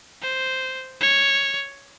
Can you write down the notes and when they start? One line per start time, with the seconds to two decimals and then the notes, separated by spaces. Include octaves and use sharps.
0.22 C5
1.01 C#5